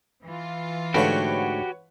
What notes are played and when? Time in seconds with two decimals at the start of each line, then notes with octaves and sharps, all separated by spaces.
0.25 E3 F4
0.94 G#2 D3 A3 F#4 G4 B4 C#5 F#5